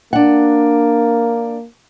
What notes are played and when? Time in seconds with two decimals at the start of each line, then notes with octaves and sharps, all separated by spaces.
0.13 A#3 D4 F#5